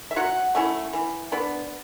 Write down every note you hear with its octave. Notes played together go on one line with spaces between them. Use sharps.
E5
F#3 F#4 F#5
A3 C#4 E4
E3
B3 D4